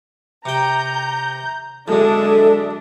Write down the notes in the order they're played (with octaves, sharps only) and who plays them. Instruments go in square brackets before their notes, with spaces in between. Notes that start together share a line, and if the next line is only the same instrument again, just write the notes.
[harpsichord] C3 G5 [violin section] A#5 G6
[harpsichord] F#2 D3 [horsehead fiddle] G#3 E5 [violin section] D4 [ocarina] A4